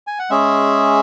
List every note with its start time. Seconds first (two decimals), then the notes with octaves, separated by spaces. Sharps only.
0.07 G#5
0.19 F#5
0.30 G#3 C#4 G#4 E5